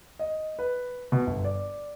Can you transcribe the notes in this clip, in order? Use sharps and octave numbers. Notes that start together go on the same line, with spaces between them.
D#5
B4
B2
G1
D5